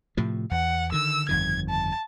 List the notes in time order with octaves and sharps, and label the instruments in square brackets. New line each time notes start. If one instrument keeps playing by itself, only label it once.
[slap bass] A2 C3 F3
[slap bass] E2 [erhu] F#5
[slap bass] D3 D#3 [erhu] E6
[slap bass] G1 F2 D#3 [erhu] G#6
[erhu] A5